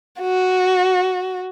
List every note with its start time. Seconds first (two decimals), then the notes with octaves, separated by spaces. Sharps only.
0.21 F#4